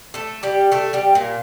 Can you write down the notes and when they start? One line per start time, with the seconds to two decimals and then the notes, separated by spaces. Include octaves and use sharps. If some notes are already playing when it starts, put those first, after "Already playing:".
0.14 A3 A4
0.43 G3 G4
0.72 A3 A4
0.93 G3 G4
1.15 A#2 A#3